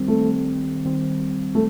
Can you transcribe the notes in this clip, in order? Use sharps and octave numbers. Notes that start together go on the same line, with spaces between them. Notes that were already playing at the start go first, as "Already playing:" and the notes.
Already playing: D#3 G3 C4
A3
D#3 G3 C4
A3